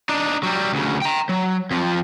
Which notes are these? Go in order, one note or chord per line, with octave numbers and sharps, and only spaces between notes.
D4 D#4
F#3 G3
D2 C#3
G5 A#5
F#3
F2 F3